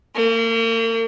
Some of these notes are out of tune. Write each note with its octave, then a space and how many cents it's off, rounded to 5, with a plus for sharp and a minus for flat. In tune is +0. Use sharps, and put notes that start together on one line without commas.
A#3 -40